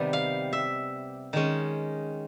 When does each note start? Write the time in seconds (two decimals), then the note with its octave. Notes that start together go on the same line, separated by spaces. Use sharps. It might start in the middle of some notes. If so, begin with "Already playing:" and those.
Already playing: C3 D#3 G3 B3
0.13 F5
0.53 E5
1.33 D#3 G#3 C#4